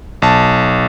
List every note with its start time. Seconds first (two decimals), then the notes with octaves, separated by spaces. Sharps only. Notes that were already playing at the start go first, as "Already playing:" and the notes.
0.22 B1 A5